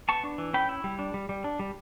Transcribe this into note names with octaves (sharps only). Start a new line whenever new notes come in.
B3 A5 C#6
D4
E3
C#4 G5 B5
E4
G3
D4
G3
G3
D4
G3